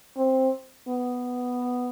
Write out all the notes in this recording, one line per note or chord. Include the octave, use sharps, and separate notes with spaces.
C4
B3